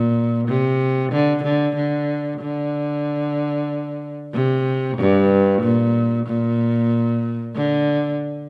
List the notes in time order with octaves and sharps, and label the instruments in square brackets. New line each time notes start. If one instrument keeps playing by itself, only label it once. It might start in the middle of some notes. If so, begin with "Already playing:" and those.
Already playing: [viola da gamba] A#2
C3
D3
D3
D3
D3
C3
G2
A#2
A#2
D3